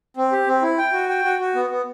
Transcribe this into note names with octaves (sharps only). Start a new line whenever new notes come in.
C4
G4
C4
E4
G5
F#4
G5
F#4
F#4
B3
B3